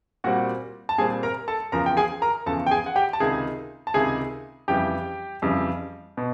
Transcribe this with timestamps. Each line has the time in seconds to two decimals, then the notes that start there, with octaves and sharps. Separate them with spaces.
0.24 A#2 G3 C4 F#4 F#5
0.89 A5
0.98 A#2 G3 C4 G#4 G#5
1.23 A#4 A#5
1.48 A4 A5
1.72 E2 C#3 F3 A#4 A#5
1.86 G5
1.97 G#4 G#5
2.22 A#4 A#5
2.46 E2 C#3 F3 A4 A5
2.67 G5
2.71 G#4 G#5
2.86 F#5
2.96 G4 G5
3.13 A5
3.20 C#2 C3 D#3 G#4 G#5
3.87 A5
3.94 C#2 C3 D#3 G#4 G#5
4.68 F2 C#3 E3 G3 G4 G5
5.42 F2 C#3 E3 G3
6.17 B2